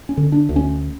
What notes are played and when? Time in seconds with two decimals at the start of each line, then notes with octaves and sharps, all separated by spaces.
0.09 C#4
0.17 D3
0.32 D4
0.49 D2
0.56 C#4